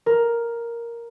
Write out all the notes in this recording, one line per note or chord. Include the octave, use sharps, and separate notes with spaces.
A#4